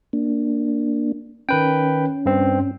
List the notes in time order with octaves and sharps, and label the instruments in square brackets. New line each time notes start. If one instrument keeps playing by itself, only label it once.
[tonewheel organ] A#3 D4
[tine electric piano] D#3 B4 G5 [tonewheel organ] C#4
[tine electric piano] G2 C4